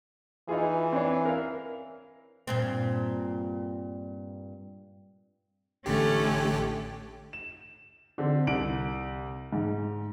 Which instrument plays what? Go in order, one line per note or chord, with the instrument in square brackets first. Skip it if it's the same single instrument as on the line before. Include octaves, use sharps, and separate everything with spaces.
[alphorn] E3 [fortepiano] D#4 F4 G#4
[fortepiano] C4 D4 C#5
A#4 F5
[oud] G2 A#2 C4
[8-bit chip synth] A1 D3 G4 [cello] A3 C#4
[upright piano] E7
D3 C4
C2 D7 F#7
G#2